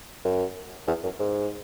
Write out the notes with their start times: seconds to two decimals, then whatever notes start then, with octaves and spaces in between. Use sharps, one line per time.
0.25 F#2
0.87 E2
1.03 F#2
1.20 G#2